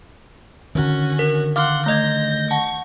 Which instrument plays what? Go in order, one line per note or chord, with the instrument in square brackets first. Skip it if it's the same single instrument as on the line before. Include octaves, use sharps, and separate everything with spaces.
[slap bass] D3 D#3 [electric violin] C#4 F#4
[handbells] A#4
[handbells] F5 D6 F6 [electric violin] F#5 C6
[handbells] A3 D#5 G#6 [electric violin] G6 A#6
[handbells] F#5 A5 [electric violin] C#6